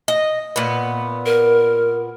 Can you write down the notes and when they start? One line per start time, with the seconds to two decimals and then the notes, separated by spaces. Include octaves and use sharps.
0.08 D#5
0.56 A#2 B3
1.26 A#4